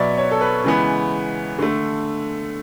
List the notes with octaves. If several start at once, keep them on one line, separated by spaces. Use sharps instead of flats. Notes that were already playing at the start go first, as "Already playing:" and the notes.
Already playing: B2 F#3 B3 D5 E5
C#5
A4
B4
C#3 E3 G#3 B3
D3 A3